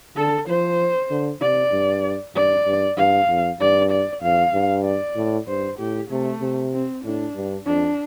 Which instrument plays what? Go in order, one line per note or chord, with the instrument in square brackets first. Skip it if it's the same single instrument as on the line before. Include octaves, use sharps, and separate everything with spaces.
[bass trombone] D3 [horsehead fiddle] A4
[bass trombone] F3 [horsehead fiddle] C5
[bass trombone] D3
[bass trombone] C3 [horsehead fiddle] D5
[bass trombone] G2
[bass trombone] G2 [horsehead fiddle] D5
[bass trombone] G2
[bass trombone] G2 [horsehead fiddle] F5
[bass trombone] F2
[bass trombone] G2 [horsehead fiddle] D5
[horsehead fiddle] D5
[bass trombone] F2 [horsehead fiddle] F5
[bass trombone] G2
[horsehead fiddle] D5
[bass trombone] A2
[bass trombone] G2 [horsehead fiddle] C5
[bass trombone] A2 [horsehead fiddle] G4
[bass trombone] C3 [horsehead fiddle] A3
[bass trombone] C3
[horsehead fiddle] C4
[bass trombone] A2 [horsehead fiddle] D4
[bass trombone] G2
[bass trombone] F2 [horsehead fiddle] D4